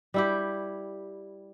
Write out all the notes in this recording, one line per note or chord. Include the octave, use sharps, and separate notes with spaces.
G3 E4 G4